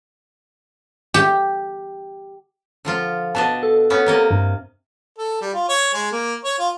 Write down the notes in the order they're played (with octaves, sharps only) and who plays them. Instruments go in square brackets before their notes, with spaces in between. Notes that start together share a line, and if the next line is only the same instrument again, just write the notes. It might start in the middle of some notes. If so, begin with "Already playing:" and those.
[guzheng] G4
[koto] D3 F3 F4
[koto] B2 D4 D#5 [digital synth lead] A5
[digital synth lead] A4
[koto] B3 C#4
C3 A#3 D#5
[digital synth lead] G2
[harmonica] A4
G3
F4
C#5
G#3
A#3
C#5
F4